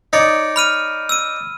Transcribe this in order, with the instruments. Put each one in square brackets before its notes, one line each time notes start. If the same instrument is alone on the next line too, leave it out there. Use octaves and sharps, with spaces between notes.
[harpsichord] D#4 C#5 D5
[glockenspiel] B5 F6 D#7
E6 D#7